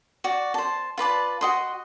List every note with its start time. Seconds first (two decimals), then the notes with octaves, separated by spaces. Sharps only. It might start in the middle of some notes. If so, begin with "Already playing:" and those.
0.24 F#4 D5
0.54 C5 A5
0.98 F4 B4 D5 A5
1.41 F#4 D#5 C6